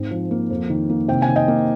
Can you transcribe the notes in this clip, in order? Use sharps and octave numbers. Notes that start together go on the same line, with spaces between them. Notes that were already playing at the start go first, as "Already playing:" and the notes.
Already playing: G#2 C4
F3
A#3
F2
D#3
A#3
C3 G5
G#5
D#3
D#5 G5
A#3